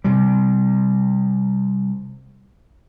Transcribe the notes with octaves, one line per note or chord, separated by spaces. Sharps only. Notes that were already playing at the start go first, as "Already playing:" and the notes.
C3 G3